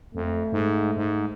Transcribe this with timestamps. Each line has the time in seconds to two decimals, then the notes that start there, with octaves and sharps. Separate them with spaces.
0.15 F2 A3
0.52 G#2
0.97 G#2